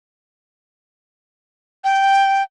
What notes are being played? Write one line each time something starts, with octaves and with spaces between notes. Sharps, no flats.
G5